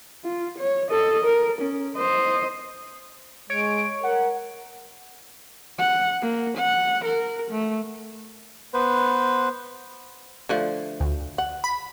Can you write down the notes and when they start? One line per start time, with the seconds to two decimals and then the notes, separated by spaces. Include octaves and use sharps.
0.25 F4
0.59 C#5
0.90 A4 D#5
1.25 A#4
1.61 C#4
1.98 C5 D#5
3.50 G#3 C#5 D7
4.03 A#4 F#5
5.79 F#5
6.22 A#3
6.58 F#5
7.05 A#4
7.51 A3
8.74 B3 B4 C5
10.49 D3 F3 A3
11.00 D2
11.38 F#5
11.64 B5